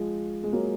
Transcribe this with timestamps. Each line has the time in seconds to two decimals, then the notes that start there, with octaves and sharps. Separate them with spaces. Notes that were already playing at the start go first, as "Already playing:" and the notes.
Already playing: F3 G#3
0.43 G#3
0.52 F#3 A#3